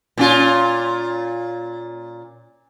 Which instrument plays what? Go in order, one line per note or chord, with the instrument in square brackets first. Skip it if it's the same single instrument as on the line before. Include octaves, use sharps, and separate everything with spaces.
[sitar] A#2 C#4 F4